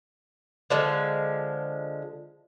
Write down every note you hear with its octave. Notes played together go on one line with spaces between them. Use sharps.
D3 F3 G#3